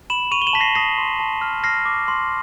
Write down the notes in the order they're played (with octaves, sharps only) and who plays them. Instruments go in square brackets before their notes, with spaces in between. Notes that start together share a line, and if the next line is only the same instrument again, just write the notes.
[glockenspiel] B5 E7 F#7
C#6 D#7 F7
G7
E7 F#7
A5 B6
A#6 C7
D#6 A#6 C7
C6
A5
F6
F6 A#6 C7
D6
C6